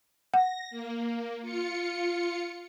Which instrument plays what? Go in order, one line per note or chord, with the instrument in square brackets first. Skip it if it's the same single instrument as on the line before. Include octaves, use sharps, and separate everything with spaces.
[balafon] F#5 [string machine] A#6
[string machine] A#3
F4 C#7